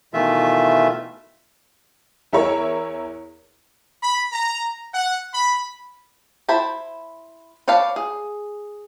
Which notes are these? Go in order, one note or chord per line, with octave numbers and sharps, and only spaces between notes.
B2 D#3 E3 A3 F4 E5
E2 E4 A#4 C#5
B5
A#5
F#5
B5
E4 C5 A5 B5
B4 C#5 D5 F5 A5
G#4